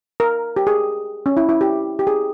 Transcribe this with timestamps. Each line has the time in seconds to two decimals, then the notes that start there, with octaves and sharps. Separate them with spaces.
0.20 A#4
0.56 G4
0.67 G#4
1.26 C#4
1.37 E4
1.49 E4
1.61 G4
1.99 G4
2.07 G#4